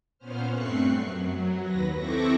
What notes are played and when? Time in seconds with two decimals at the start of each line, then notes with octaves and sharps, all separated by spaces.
0.18 A#2 B3 C#4 C5 F6
0.50 G2 A3 C4 C#6 F#6 C7
0.89 F#2
1.21 F#3
1.61 D#2 B4 A#6
1.95 C4 E4 A4 C#6 D6 A#6